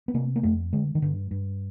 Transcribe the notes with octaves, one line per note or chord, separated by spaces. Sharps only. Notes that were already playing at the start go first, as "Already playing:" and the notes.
B3
C3 A#3
A#3
F2 A3
D3 G#3
D#3
G2 D3
G2